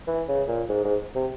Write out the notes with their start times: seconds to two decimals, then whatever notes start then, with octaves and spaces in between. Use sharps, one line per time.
0.07 E3
0.28 C#3
0.48 A#2
0.69 G#2
0.84 G#2
1.15 C3